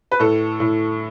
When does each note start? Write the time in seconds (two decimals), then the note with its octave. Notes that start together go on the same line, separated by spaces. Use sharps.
0.11 B4
0.20 A2 A4
0.60 A2